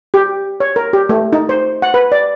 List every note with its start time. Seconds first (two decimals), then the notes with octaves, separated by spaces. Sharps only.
0.14 G4
0.60 C#5
0.76 A#4
0.93 G4
1.09 A3
1.33 D#4
1.49 C5
1.82 F#5
1.94 B4
2.12 D5